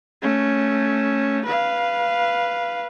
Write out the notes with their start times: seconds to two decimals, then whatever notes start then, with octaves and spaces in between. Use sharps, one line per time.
0.22 A3 C#4
1.45 B4 F5